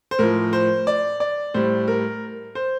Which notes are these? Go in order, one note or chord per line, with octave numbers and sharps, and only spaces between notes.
C5
A2 F3 A#4
C5
D5
D5
A2 G3 C5
A#4
C5